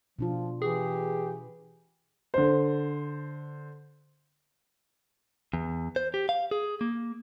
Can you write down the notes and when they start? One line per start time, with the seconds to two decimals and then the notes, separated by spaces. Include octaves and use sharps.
0.19 B2 F3 D4 F4
0.62 E3 G4 G#4
2.34 D3 C5
5.53 E2
5.96 C5
6.14 G4
6.29 F5
6.51 G#4
6.81 A#3